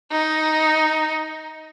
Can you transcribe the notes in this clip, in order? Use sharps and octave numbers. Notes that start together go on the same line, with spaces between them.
D#4